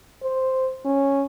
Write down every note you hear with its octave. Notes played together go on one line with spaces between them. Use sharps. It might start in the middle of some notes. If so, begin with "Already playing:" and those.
C5
C#4